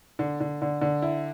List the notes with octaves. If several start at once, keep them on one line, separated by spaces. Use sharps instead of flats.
D3
D3
D3
D3
E4